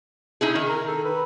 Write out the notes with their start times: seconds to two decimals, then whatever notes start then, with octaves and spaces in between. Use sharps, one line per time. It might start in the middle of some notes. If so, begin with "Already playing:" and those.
0.41 D#4 E4 G#4
0.55 D#3
0.69 A#4
0.88 A4
1.04 B4